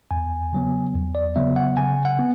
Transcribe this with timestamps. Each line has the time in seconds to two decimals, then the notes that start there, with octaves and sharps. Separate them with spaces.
0.11 E2 G#5
0.52 C#3 F#3 B3
0.95 E2
1.15 D5
1.36 C#3 F#3 B3 E5
1.56 F#5
1.77 C#3 G#5
2.05 F#5
2.19 B3